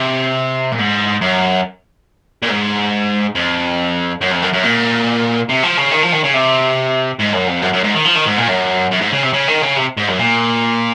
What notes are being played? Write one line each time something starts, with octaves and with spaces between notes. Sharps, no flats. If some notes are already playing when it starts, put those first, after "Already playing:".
Already playing: C3
A#2
G#2
F#2
A#2
G#2
F2
F#2
F2
F#2
F#2
A#2
C3
F3
C#3
D#3
F3
D#3
C#3
C3
G#2
F#2
F2
F#2
F#2
G#2
D#3
F3
D#3
G#2
A#2
F#2
F#2
G#2
C#3
C3
C#3
D#3
C#3
C3
G#2
F#2
A#2